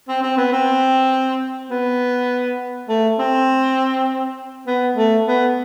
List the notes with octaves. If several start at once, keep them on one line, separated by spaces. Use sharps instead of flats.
C4
C4
B3
C4
B3
A3
C4
B3
A3
B3